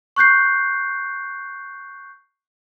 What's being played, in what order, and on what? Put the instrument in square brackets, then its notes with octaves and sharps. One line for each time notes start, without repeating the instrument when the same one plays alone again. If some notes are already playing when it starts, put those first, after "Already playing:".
[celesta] C#6 F#6 G6 C7